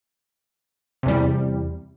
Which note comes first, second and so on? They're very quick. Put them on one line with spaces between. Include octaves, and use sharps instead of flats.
C3 E2 G3